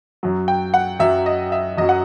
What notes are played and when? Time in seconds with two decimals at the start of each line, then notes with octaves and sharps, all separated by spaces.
0.23 F#2 F#3
0.48 G5
0.74 F#5
1.00 F#2 F#3 E5
1.26 D#5
1.52 E5
1.78 F#2 F#3 D#5
1.89 F#5